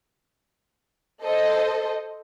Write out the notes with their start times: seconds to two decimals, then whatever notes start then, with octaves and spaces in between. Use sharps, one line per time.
1.23 A4 C5 D#5